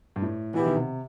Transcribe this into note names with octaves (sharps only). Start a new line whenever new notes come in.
G2
A2
B2 E3 B3 E4 G4
D#3
C3